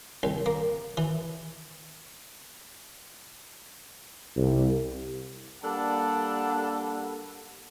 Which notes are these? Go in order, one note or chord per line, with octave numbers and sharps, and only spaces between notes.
C2
A#3
E3
C2
G3 A#3 D4 A4 F#5 A5